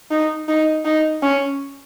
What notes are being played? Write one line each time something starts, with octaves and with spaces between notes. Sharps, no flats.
D#4
D#4
D#4
C#4